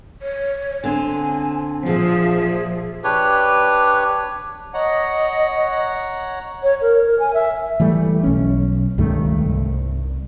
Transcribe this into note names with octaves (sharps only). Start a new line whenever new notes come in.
C#5
D3 C4 G#5
A#2 F3 G#4 E5
D4 G4 B4 C#5
C#5 D#5 F#5 A#5
C#5
A#4
A#4
G#5
E5
E3 G3 A3
B1 C#4
C#2 G2 D#3 A3
C2